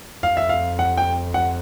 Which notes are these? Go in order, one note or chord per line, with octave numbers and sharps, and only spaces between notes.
F2 F5
E5
F5
F#5
G5
F#5